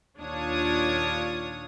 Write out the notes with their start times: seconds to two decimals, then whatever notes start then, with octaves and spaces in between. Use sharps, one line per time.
0.18 D#2 A#2 D4 F4 C#5 D#6